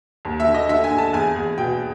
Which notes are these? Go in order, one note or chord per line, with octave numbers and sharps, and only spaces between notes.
D#2
E5
D3
D#5
D3 E5
G#5
D3
A5
E2 G#5
E2
B2 G5